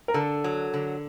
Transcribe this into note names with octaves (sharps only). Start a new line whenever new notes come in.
A#4
D3 A4
F#3
D3